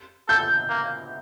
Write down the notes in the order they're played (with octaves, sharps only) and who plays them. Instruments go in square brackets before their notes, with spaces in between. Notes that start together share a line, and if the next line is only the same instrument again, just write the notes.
[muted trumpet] A4 [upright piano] G6
[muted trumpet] A#3